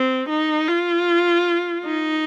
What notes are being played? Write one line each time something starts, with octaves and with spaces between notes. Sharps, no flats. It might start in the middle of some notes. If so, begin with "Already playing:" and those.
Already playing: C4
D#4
F4
D#4